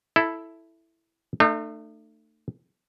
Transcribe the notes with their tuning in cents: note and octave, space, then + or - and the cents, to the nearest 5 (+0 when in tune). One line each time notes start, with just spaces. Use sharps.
E4 +0 A4 +0
A3 +25 D#4 -45